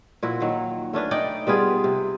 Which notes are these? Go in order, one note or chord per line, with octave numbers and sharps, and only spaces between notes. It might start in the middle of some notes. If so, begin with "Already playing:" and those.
A#2 F3 E4 F#4
D#3 F#3
A3 C#4 D4 B4
D#4 D5 G5
G3 B3 F4 G#4
C3